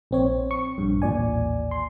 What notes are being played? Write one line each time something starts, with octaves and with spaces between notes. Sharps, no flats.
A#1 C4 C#5
C#6
A#1 G2
A1 D#2 A#2 D5 G#5
C6